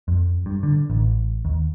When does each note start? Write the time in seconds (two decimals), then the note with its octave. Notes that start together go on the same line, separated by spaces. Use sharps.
0.08 F2
0.46 G2
0.63 D3
0.90 A1
1.45 D#2